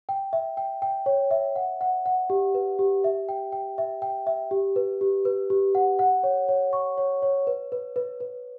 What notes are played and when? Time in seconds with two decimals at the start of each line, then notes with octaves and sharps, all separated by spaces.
0.09 G5
0.33 E5
0.57 G5
0.82 G5
1.06 C#5
1.31 E5
1.56 F#5
1.81 F#5
2.06 F#5
2.30 G4
2.55 B4
2.79 G4
3.04 E5
3.29 G5
3.52 G5
3.78 E5
4.02 G5
4.27 E5
4.51 G4
4.76 B4
5.01 G4
5.25 B4
5.50 G4
5.75 F#5
5.99 F#5
6.23 C#5
6.49 C#5
6.73 C#6
6.98 C#5
7.22 C#5
7.47 B4
7.72 B4
7.96 B4
8.20 B4